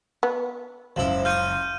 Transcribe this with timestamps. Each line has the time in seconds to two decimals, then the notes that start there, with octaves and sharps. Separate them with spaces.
0.23 B3
0.96 F#1 C#2 F3 E4
1.25 F4 C#6 D#6 F6 G6 D#7